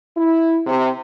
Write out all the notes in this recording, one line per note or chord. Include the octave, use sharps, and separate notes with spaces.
E4
C3